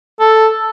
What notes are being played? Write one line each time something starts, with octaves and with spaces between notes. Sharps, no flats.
A4